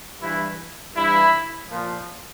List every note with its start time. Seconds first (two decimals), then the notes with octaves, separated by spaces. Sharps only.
0.21 G2 E3 E4
0.96 G2 E3 E4
1.69 A#2 F3